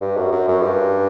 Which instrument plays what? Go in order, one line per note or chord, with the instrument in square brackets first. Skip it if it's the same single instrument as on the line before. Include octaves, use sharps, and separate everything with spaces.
[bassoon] G2
F#2
F#2
F#2
G2